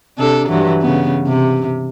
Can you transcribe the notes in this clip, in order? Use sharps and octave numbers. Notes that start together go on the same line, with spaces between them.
C3 D4 A4
G2 E3 F#3
C#3 B3
C3